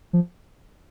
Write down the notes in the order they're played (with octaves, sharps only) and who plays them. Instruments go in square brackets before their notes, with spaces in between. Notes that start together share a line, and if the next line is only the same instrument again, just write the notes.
[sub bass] F3